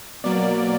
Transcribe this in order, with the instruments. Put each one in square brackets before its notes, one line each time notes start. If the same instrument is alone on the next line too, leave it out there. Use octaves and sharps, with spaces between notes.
[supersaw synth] B2 F#3 A#3 D5